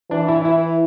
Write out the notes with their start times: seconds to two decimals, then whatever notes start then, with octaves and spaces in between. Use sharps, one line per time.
0.11 E3 D4
0.28 E4
0.45 E4